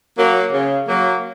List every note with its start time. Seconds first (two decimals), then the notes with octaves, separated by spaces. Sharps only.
0.17 F#3 A#3
0.53 C#3
0.87 F#3 A#3